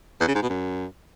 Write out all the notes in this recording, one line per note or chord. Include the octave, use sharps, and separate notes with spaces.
E2
C#3
G#2
B2
F#2